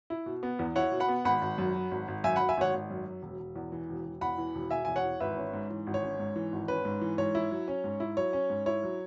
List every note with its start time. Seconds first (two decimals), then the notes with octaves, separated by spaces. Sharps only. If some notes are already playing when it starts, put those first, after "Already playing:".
0.10 E4
0.26 B2
0.43 B3
0.59 E2
0.76 E4 C#5 F#5
0.92 B2
1.00 F#5 B5
1.08 B3
1.25 G#1 F#5 B5
1.41 G#1
1.58 F#2
1.74 F#3
1.91 G#1
2.08 G#1
2.24 F#2 E5 G#5
2.36 F#3 F#5 B5
2.49 E5 G#5
2.57 G#1 C#5 F#5
2.73 G#1
2.90 F#2
3.06 F#3
3.22 E1
3.39 E1
3.56 E2
3.72 E3
3.89 E1
4.05 E1
4.21 E2 F#5 B5
4.38 E3
4.55 E1
4.70 E1 E5 G#5
4.85 E2 G#5
4.96 C#5 F#5
5.04 E3
5.20 G#1 B4 E5
5.37 C#4
5.53 G#2
5.70 E3
5.87 G#1
5.94 C#5
6.03 C#4
6.19 G#2
6.36 E3
6.52 G#1
6.68 C#4 B4
6.85 G#2
7.01 E3
7.18 G#2 C#5
7.35 E4
7.51 F#3
7.68 C#4
7.84 G#2
8.00 E4
8.17 F#3 C#5
8.33 C#4
8.50 G#2
8.66 E4 C#5
8.83 F#3